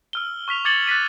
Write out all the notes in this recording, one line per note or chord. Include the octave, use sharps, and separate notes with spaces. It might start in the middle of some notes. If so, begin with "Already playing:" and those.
E6 F6 G7
C#6 F6 B6 F7
D6 G#6 A6 C#7 F#7 G7
F#6 A6 B6 D#7